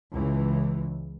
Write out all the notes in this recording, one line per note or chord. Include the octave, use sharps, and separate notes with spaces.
C#2 E3